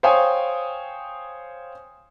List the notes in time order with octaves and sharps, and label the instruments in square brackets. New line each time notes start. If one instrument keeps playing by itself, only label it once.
[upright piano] C5 C#5 F5 G5 G#5 D#6